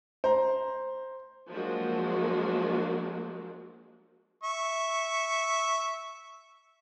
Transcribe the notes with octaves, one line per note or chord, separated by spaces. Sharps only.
C5 A#5
F3 F#3 G#3 A#3 D4 F#4
E5 C#6